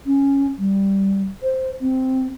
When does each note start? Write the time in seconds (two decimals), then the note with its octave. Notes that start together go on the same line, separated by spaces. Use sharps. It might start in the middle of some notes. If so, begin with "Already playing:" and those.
0.06 C#4
0.58 G3
1.43 C5
1.81 C4